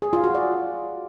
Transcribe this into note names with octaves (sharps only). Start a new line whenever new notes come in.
G#4
F4
F#4
D5